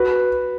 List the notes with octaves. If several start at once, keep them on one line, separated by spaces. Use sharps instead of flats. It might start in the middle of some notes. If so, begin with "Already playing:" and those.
Already playing: F#4 B4